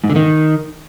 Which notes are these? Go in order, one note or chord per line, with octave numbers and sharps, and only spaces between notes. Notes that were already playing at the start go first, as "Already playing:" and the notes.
G#2
D3
D#3